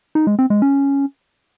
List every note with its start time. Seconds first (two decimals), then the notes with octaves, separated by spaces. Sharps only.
0.15 D#4
0.27 G#3
0.39 C4
0.50 G#3
0.62 C#4